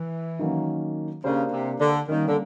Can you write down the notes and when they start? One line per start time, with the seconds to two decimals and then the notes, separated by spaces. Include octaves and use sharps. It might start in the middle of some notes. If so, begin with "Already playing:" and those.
Already playing: E3
0.39 D#3 F#3 A#3 C#4
1.24 C#3 A#3 D4 G4 C5
1.52 C3
1.80 D3
2.08 D#3 G3 A#3 C#4
2.28 D3